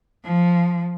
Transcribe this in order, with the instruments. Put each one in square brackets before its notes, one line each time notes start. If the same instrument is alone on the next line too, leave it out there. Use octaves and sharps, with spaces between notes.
[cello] F3